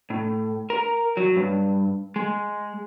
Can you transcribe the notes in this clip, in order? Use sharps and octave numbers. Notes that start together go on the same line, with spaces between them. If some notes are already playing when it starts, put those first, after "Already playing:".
A2
A#4
F#3
G2
G#3